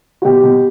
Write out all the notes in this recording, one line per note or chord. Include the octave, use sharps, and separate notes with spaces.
F#4
B2 G4
B2